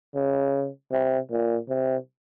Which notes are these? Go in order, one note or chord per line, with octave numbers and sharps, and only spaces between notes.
C#3
C3
A#2
C3